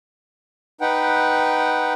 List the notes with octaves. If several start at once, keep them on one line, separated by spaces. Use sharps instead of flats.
D#4 B4 F#5 G5